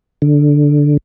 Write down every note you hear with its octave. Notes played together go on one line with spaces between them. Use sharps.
D3